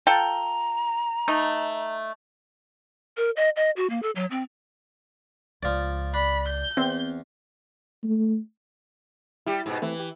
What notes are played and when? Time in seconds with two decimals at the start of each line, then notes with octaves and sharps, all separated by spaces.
0.07 F4 A4 G5 A#5
1.28 A3 D#4
3.17 A#4
3.36 D#5
3.56 D#5
3.77 F#4
3.90 A#3
4.03 A4
4.16 F#3
4.31 C4
5.63 C#2 C#3 F3 D5
6.14 D4 B5
6.48 G6
6.77 E2 C4
8.04 A3
9.47 G3 E4 G4
9.66 G#2 B2
9.82 E3 A3 C4 E4
10.00 G4